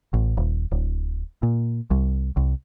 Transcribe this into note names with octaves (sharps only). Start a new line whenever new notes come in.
A1
D#1
D1
A#2
C2
C2